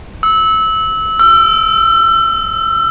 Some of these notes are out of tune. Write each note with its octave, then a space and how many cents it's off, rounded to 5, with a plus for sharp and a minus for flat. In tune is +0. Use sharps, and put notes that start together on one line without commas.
E6 -20
E6 +35